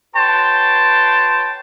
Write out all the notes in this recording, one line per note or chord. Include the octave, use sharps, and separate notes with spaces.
F#4 B4 C#5 G5 A5 C6